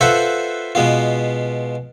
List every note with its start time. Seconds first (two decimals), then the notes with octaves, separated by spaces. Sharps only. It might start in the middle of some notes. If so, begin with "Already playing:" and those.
0.01 F4 A4 B4 C5 E5 F#5
0.75 B2 G#3 B3 F4